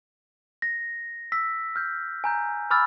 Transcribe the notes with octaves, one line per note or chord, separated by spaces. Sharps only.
A#6
E6 B6
F6 G6
G#5 A#5 G6
G#5 B5 D6 E6 F6 A6